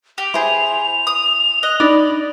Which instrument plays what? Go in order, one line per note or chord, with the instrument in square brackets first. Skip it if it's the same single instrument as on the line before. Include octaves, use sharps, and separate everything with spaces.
[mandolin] G4 [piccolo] F7
[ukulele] E4 [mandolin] G#4 C5
[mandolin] D#6
[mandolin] D#5 [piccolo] F#6
[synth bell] D4 D#4 [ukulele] D5 [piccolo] B5